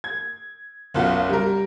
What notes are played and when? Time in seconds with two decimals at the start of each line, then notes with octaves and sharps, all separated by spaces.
0.04 G#6
0.94 F#1 B1 F4 F#5
1.29 G3 A#4